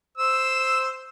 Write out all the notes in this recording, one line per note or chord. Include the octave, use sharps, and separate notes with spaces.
C5 E6